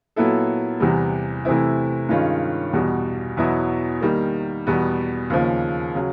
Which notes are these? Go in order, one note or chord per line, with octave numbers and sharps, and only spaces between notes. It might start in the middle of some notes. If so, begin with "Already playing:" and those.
A#2 F#3 B3 E4 A4
E2 C3 E3 G3
C3 E3 A3 C4 E4
G2 D#3 G#3 C#4 F4
E2 B2 G3
E2 B2 F#3 B3 E4
D#3 G3 A#3
E2 B2 G3 B3
D#2 C#3 F3
C#3 F#3